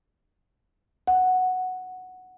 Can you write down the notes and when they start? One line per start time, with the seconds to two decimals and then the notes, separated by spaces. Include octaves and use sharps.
1.08 F#5